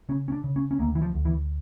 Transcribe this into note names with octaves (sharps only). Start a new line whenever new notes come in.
C#3 C#4
C#4
D4
C#3
C#4
C#4
D2 A#3
E3
F3
D2
E3